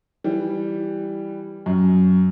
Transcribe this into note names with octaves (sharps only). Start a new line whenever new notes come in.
E3 G3
F#2